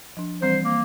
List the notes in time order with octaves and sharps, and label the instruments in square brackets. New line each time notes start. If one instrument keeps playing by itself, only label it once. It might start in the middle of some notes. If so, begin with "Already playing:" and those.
[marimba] F3 D4
[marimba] E3 G3 C4 [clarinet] C5
[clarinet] A#3